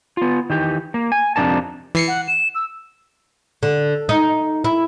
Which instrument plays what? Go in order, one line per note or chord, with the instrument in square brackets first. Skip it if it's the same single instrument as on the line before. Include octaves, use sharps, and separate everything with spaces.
[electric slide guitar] B3 F4
D#3 E3 G4
A#3
G#5
F2 C3 F3 D4 A#4 A5
[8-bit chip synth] E3 C7 C#7
[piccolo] F#5
E7
E6
[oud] D3
D#4
E4